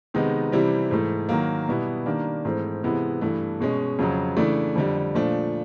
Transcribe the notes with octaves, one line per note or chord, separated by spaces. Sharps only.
C3 D#3 G#3 B3 D#4
C3 E3 G3 C4 E4
G#2 E3 A3
D#3 F#3 A#3
B2 G3 B3 E4
D#3 G3 A#3 D4
G#2 E3 A3 C4
C3 E3 G#3 B3 E4
G2 E3 A3
B2 G#3 C#4
F2 C#3 F#3
C#3 E3 A3 D4
F2 D3 G3
A#2 F3 A3 D4